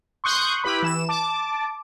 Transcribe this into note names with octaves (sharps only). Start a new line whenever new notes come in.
C6 C#6 D#6 F#6 G6
E4 G4 B4 B5
E3 E7
A5 D6